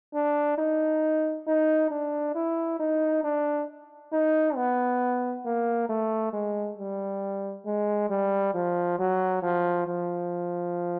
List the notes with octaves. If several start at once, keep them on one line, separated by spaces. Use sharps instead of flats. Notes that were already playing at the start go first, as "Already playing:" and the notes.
D4
D#4
D#4
D4
E4
D#4
D4
D#4
B3
A#3
A3
G#3
G3
G#3
G3
F3
F#3
F3
F3